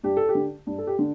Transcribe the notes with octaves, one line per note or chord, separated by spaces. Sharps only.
G2 G4
A4
G4
D3
G2
A4
G4
D3